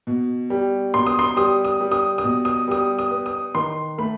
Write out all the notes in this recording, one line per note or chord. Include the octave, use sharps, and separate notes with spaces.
B2
G3
B2 C6
D#6
C6
G3 D#6
D#6
G3
D#6
D#6
B2
D#6
G3 D#6
D#6
B3
D#6
D#3 C6
A3 B5